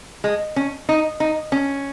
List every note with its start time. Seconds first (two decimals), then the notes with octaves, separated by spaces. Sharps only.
0.24 G#3
0.56 C#4
0.89 D#4
1.20 D#4
1.52 C#4